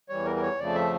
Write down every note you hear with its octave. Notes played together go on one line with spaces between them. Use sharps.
E2 E3 G3 C#5
A#4
A#4
C#5
F2 C#3 F3 A3 D5
E5